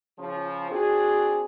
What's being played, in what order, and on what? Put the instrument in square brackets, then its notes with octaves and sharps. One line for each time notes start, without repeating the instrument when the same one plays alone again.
[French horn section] C#3 F3
C4 D4 F#4 G#4